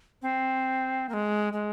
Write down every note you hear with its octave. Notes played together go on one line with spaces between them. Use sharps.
C4
A#3
G#3
G#3